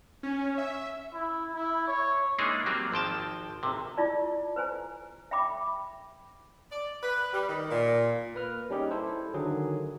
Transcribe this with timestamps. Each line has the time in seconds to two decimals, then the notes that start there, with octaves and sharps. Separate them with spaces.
0.23 C#4
0.58 E5
1.14 E4
1.55 E4
1.88 C#5
2.38 E3 G#3 A#3 D4 D#4 G#4
2.66 F#3 G3 A#3 C4
2.92 G#1 F3 G5 A5
3.63 G#1 C3
3.97 E4 F4 D5 A5
4.56 B4 C5 G#5 A#5
5.31 E5 G5 B5 D6
6.72 D5
7.03 B4
7.33 G3
7.49 D#3
7.71 A#2
8.35 A#3 B4 F6
8.70 G3 C#4 D#4 G4 G#4
8.91 E4 A4 C5
9.34 D3 D#3 F#3 G#4